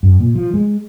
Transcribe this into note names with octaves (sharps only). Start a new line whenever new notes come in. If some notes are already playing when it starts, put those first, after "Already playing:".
F#2
A#2
F3
G#3